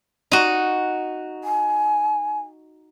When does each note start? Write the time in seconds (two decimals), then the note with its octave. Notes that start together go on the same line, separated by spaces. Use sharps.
0.32 D#4 F#4
1.44 G#5